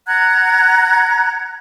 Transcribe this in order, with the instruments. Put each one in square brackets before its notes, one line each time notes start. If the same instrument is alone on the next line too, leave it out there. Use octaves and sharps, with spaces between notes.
[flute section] F#5 A#5 F#6 G#6